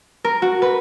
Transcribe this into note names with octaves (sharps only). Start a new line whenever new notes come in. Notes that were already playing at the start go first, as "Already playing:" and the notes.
A#4
F#4
B4